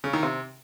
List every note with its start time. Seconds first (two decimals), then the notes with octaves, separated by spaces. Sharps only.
0.04 C#3
0.13 D#3
0.23 C3